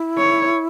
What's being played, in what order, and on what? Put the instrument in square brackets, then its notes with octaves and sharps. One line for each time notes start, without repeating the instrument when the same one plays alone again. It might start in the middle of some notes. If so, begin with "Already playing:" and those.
Already playing: [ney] E4
[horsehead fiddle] C#5